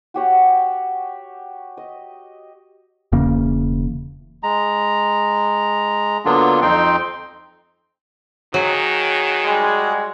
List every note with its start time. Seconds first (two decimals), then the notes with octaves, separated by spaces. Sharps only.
0.14 F#4 G4 C#5 F#5
1.77 D#5
3.12 E1 E2 C#3 A#3
4.43 G#3 A#5
6.25 D3 F#3 A#3 B3 D4 F4
6.62 F2 C4 D#4 G5 C6
8.54 D#3 F#3 F#4 G#4 F#5
9.45 G3 G#3